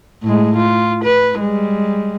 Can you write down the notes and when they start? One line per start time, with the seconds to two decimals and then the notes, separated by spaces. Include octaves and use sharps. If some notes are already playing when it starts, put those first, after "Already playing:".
0.23 A2 G#3
0.57 F4
1.03 B4
1.40 G3 G#3